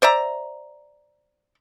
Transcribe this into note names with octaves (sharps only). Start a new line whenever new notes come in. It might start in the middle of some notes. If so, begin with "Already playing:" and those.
C5 D5 E5 A#5